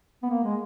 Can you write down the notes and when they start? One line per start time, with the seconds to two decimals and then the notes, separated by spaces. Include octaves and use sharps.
0.23 B3
0.30 A#3
0.44 G#3